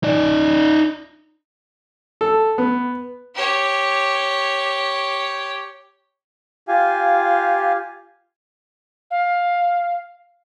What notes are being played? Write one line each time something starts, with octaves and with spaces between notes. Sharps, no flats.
D#4 D5
A4
B3
G4 C#5
F4 G4 F5 G#5
F5